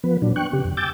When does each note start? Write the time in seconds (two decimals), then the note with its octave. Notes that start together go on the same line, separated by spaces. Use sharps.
0.04 F3 B3 B4
0.22 A#2 F#3 D4
0.36 G5 C#6 F#6
0.53 C#3 G4
0.64 F2
0.77 G5 G#5 D6 E6 G6 A6